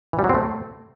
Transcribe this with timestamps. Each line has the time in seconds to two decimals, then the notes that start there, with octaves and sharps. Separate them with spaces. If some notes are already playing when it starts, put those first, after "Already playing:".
0.13 E3
0.19 G3
0.24 F#3
0.29 C4
0.35 A3